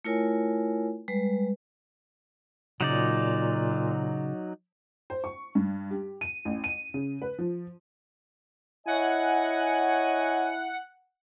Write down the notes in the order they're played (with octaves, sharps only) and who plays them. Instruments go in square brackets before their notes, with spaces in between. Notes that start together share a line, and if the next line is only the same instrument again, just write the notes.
[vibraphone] A3 E4 F4 A#4 C#5 G#5
G3 G#3 B4
[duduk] A#2 [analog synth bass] C#3 [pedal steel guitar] F#3 D#4 D5
[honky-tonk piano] C5
C#6
G2
G4
D#7
A1
D#7
C#3
B4
F3
[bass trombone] E4 [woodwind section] C#5 D#5 G#5 [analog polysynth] F#5